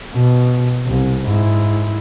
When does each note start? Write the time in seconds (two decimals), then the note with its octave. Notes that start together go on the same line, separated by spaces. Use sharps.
0.14 B2
0.86 C2
1.26 G#2 E4